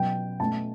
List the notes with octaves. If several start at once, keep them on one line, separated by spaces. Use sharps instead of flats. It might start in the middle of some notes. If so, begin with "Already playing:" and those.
Already playing: B2 F#3 C#4 G5
B2 A3 C#4 A5